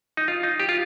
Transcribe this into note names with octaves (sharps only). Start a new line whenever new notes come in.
D#4
F4
D#4
G4
F4